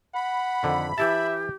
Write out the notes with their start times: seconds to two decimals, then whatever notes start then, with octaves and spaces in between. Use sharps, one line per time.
0.15 F#5 B5
0.63 F2 D3 D#3
0.98 E3 E4 G4 E5 A5